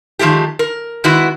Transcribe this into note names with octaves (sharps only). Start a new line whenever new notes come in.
D#3 F3 G#3 A3 G4
A#4
D#3 G#3 B3 E4 F#4